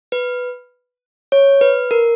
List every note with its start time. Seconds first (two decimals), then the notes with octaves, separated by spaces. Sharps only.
0.12 B4
1.32 C#5
1.61 B4
1.91 A#4